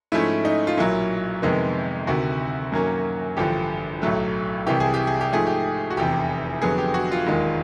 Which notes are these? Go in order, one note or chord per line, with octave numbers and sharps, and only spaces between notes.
G#2 F3 A3 C#4 E4
D#4
F4
B1 A#2 F#3 E4
F2 C3 D#3 G#3 B3
D2 C3 D#3 F#4
F#2 D#3 F#3 A#3 C#4
A1 G2 D3 F3 G4
B1 A2 F#3 A3
C2 C3 E3 G4
G#4
G4
G#4
G4
G#2 F3 A3 G#4
G4
F#4
F1 E2 C3 G4
F2 D3 F#3 B3 G#4
G4
F#4
F4
E1 D#2 D#3 G#3